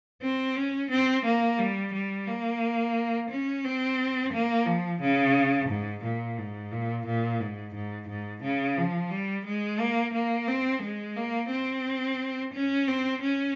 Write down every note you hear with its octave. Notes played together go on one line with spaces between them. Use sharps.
C4
C#4
C4
A#3
G3
G3
A#3
C#4
C4
A#3
F3
C#3
G#2
A#2
G#2
A#2
A#2
G#2
G#2
G#2
C#3
F3
G3
G#3
A#3
A#3
C4
G#3
A#3
C4
C#4
C4
C#4